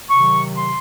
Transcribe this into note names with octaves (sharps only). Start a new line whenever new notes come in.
C3 D#3 F#3 C#6
C6